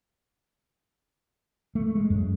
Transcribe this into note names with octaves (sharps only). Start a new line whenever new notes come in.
A3
G#3
F#2